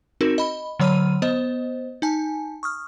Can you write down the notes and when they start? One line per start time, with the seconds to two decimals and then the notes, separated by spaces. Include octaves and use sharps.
0.21 C4 D#4 F#4 A#4 E7
0.38 D#5 B5
0.79 D3 F#3 C#5 B5 F6 D#7
1.22 B3 C5 D#5
2.02 D#4 G#5 A5
2.63 C#6 D#6 F6